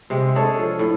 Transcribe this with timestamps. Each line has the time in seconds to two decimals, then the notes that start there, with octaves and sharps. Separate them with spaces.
0.10 C3 G#3
0.36 D4 G#4 A4 C#5
0.59 F3
0.79 A2